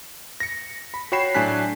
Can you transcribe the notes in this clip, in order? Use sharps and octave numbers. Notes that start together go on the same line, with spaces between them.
A#6 C#7
B5
F#4 C#5 G5 B5 C7 E7
A2 F#3 D4 G#5 F#6 B6